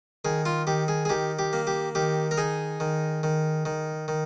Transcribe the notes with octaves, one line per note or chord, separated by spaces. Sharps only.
D#3 G#4
F4
D#3 G4
G#4
G#4
D#3 G4
G4
A#3
G4
D#3 G4
A#4
D#4 G#4
D#3
D#3
D#3
D#3